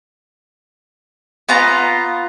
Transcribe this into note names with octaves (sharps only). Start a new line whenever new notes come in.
B3 F4 A#5